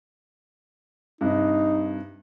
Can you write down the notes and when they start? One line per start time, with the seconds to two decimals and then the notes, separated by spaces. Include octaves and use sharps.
1.21 G2 C3 D#4